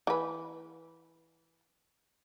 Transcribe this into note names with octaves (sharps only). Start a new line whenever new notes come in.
E3 B4